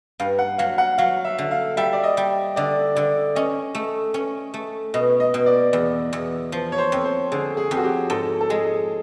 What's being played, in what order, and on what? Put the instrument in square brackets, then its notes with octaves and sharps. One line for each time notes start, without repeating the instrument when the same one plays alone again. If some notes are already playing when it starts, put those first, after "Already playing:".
[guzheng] G2 [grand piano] F5
[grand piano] F#5
[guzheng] F#3 [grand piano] F5
[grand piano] F#5
[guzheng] F#3 [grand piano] F5
[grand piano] E5
[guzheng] D3
[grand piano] F5
[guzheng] G3 [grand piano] E5
[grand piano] D5
D#5
[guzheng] G3
[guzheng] D3 [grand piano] D5
[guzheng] D3 [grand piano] D5
[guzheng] C#4 [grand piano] D#5
[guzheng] A3
C#4
A3
[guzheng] B2 [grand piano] D#5
[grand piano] D#5
[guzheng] B2
[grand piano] D5
[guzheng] E2
E2
F3
[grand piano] C#5
C5
[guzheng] F2
[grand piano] C5
[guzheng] D3 [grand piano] G#4
[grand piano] G#4
[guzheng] F2
[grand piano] F#4
G4
[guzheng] G#2 [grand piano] A4
[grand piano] A4
[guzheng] G#3 [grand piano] G#4